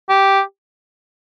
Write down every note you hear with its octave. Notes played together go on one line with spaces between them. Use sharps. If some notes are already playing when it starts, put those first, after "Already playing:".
G4